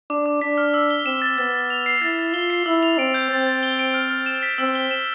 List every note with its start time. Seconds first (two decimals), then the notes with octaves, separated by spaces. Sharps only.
0.10 D4 D6
0.26 D6
0.41 D4 B6
0.57 F6
0.74 E6
0.90 G7
1.06 C4 E7
1.22 A6
1.38 B3 A6
1.54 A6
1.70 F7
1.86 C7
2.02 E4 A6
2.19 A6
2.34 F4 G7
2.50 C7
2.66 E4 E6
2.83 F7
2.99 C4 D7
3.14 G6
3.31 C4 A6
3.47 A6
3.63 G7
3.79 D7
3.94 F6
4.10 F6
4.26 E7
4.43 B6
4.58 C4 E6
4.75 G7
4.91 E7